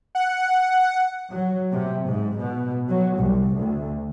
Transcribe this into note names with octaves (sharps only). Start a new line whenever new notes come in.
F#5
F#3
C3
G#2
B2
F#3
C2
D2